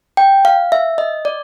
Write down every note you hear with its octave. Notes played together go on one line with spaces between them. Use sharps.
G5
F5
E5
D#5
D5